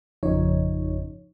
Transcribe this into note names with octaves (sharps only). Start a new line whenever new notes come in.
G#1 F2 C#3 F3 D#4 C#5